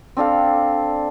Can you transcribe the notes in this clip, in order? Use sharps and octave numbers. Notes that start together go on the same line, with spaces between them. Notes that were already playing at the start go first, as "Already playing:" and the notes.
C4 D4 A4 F5